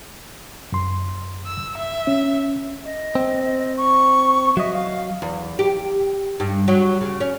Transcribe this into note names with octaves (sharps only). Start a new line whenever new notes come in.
F#2 C6
E6
E5
C#4
D#5
C4
C#6
F#3 D#5 E5
F5
E2
G4
G2
F#3
C#3
C#4